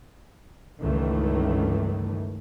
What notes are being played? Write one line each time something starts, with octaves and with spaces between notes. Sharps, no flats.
C#2 G2 D#3 E3 A3